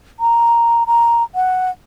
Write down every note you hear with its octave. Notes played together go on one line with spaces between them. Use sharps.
A#5
A#5
F#5